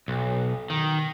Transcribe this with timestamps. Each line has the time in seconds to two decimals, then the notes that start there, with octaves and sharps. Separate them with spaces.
0.08 B1
0.70 D#3